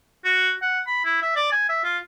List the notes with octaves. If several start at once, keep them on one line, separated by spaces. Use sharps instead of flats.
F#4
F#5
B5
E4
E5
D5
G#5
E5
F4